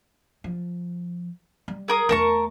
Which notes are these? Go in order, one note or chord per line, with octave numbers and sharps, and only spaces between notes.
F3
G3
G#4 A#4 D#6
E2 A3 A#4 A5 C#6